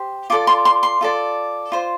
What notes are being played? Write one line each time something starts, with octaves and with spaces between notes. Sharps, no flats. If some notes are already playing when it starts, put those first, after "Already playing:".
Already playing: G4 C5
F4 A4 D5 D6
C6
C6
C6
F4 A4 D5
F4 C5